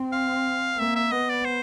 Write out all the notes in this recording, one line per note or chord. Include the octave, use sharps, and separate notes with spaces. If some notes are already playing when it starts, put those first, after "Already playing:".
Already playing: C4
F5
A#3 E5
E5
B3 D#5
D5
C5